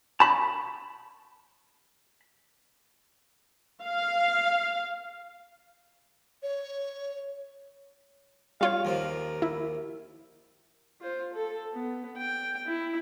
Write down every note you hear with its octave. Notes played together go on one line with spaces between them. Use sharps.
A5 B5
F5
C#5
G3 F4 C#5 F5
D#2 F3 A#4
E4
F4 C5
A4
B3
G5
E4